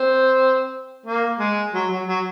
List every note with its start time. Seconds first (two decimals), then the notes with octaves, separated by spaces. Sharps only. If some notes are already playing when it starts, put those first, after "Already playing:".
Already playing: C4
1.06 A#3
1.39 G#3
1.74 F#3
1.90 F#3
2.07 F#3